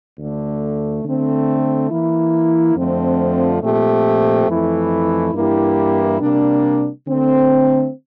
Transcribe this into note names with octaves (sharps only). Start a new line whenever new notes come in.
D2 D3 A3
D3 A3 C4
E3 A#3 E4
F2 D3 F3 A3 C4
A#2 F3 A3 C4 G4
F2 E3 A3 E4
G2 E3 A#3 E4 G4
C3 G3 A#3 D4
D3 A3 C4